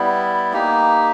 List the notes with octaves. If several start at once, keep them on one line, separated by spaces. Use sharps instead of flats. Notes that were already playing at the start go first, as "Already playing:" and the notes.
Already playing: G3 B3 E4
A#3 D#4 G4